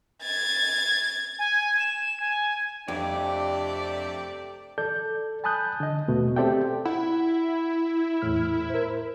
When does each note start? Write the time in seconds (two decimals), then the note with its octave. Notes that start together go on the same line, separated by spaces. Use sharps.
0.23 G#6 A6
1.39 G#5
1.79 E7
2.20 G#5
2.88 F2 C3 A3 D4 G4 D5
4.78 A4 D5 G6
5.44 G#5 A5 B5 D#6 F#6 G6
5.80 D3 D#5
6.08 D#2 B2 A3
6.36 C4 G4 A4 D5 E5 G5
6.85 E4 F#5
8.22 E2 A2 F6
8.70 A#4 C5